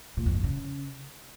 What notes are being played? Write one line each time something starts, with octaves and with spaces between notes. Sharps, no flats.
A#2
F2
G2
C#3